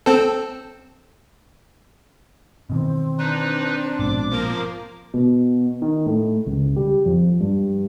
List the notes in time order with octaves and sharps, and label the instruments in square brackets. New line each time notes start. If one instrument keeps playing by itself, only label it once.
[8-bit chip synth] C4 A4
[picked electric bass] B2 D#3 E3 [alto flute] C4
[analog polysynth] D4 [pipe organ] D#4 B4
[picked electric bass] A#1 G#2 B2 [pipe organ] D6
[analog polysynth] F3 A#3 A#4
[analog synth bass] B2
D#3
A2
C#2
G3
F2
G2